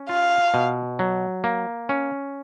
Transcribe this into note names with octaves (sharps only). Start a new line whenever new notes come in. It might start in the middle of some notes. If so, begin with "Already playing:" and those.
Already playing: C#4
F4 F5
B2
F#3
A#3
C#4